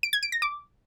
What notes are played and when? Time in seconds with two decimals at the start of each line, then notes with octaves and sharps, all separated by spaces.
0.03 D7
0.13 G#6
0.23 D7
0.32 A#6
0.42 D6